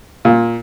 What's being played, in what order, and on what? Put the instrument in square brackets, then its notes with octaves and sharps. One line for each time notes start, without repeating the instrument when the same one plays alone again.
[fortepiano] A#2